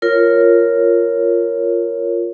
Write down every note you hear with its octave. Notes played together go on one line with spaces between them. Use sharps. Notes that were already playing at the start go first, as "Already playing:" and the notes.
F4 A#4 C#5